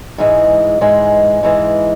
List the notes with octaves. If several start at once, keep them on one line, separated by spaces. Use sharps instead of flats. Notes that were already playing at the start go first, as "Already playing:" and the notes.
G#2 E3 G#3
G#2 E3 G#3
G#2 E3 G#3